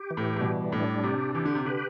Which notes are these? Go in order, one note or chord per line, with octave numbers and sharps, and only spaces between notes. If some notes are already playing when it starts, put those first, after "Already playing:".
Already playing: G4
E3
A2
A2
B2 G3
A2 D4
C3 G4
E3 G4
D3
C3
D3 B4